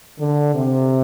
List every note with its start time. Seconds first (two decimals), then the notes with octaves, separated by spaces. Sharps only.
0.20 D3
0.54 C3